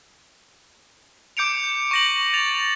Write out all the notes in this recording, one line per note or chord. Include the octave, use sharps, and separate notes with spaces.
D6 G6 C#7 D7 F7
C#6 A#6 F#7
A6 F7